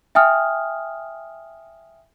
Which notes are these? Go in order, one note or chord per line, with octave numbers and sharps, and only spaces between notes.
E5 G5 G#5 D#6 F6